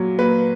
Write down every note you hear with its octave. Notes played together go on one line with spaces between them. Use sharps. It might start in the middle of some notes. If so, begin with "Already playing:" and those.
Already playing: A#2 F#3
A#2 B4